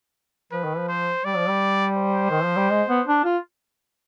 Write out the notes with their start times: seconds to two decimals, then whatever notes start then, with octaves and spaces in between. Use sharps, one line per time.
0.52 F3 B4
0.64 D#3
0.78 F3
0.88 C5
1.24 G3 D5
1.37 F3
1.49 G3
1.97 C5
2.31 D#3
2.44 F3
2.57 G3
2.70 G#3
2.88 B3
3.07 D4
3.25 F4